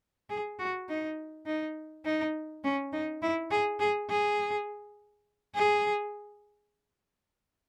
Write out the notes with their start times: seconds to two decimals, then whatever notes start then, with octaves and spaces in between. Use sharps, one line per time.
0.30 G#4
0.59 F#4
0.89 D#4
1.46 D#4
2.05 D#4
2.64 C#4
2.93 D#4
3.22 E4
3.51 G#4
3.80 G#4
4.09 G#4
5.55 G#4